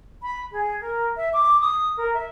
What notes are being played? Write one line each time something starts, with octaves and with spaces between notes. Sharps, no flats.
B5
G#4
A#4
E5
D6
D#6
A#4
E5